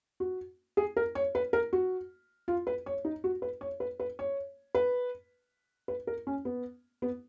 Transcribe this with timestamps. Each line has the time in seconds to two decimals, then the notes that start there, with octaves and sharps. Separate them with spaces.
0.20 F#4
0.77 G#4
0.97 A#4
1.15 C#5
1.35 B4
1.53 A#4
1.73 F#4
2.48 F4
2.67 B4
2.86 C#5
3.05 D#4
3.24 F#4
3.42 B4
3.61 C#5
3.80 B4
4.00 B4
4.19 C#5
4.75 B4
5.88 B4
6.07 A#4
6.27 C#4
6.45 B3
7.02 B3